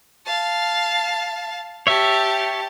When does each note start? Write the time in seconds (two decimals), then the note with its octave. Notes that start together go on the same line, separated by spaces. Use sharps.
0.26 F5 A5
1.87 G4 C#5 E5 A5